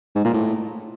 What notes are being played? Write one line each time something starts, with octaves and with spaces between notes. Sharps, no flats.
G#2
A#2
A2